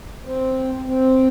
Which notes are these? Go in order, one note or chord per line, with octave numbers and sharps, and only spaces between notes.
C4
C4